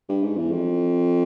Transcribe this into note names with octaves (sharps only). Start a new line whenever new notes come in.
G2
G#2
E2
F2